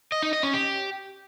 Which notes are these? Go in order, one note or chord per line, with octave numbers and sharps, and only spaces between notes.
D#5
D#4
D#5
C#4
G4